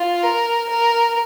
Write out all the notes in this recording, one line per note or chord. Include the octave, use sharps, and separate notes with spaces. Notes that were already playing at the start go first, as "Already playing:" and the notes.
Already playing: F4
A#4
A#4